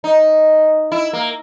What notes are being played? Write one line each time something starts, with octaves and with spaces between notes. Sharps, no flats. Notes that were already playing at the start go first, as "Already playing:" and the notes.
D#4
E4
A#3